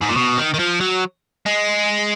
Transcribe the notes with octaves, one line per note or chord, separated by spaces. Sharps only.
G#2
A#2
B2
D#3
D#3
F3
F#3
G#3